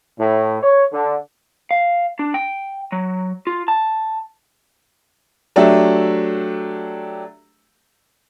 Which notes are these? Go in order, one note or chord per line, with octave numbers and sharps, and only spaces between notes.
A2
C#5
D3
F5
D4
G5
F#3
F4
A5
F#3 A3 D4 G4 E5